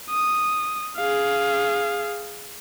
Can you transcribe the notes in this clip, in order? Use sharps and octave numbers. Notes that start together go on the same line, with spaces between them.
D#6
G#4 F5